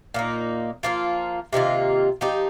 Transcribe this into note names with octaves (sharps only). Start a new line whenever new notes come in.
A#2 A#3 D#4
F3 A#3 F4
C3 D#3 A#3 F4
F3 D#4 G4